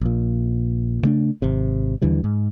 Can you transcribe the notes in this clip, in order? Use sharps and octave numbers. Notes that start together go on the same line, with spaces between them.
A#1 A#2
C#3 A3 D4
G#1 C3
D#2 D3 E3 G3
G#2